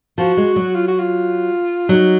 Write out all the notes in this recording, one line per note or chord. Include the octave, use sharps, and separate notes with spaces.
F3 F#4
G#3
F#3
F4
F#4
F4
F#3 D#4